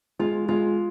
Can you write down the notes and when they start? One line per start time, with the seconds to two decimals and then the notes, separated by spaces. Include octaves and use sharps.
0.19 G#3 F4
0.48 G#3 F4